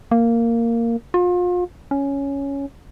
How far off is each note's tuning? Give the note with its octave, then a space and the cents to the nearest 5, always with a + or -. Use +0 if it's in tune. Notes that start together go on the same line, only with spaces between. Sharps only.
A#3 -10
F4 +35
C#4 +5